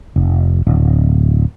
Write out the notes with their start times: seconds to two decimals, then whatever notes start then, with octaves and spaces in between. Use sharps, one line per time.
0.16 F1
0.67 D1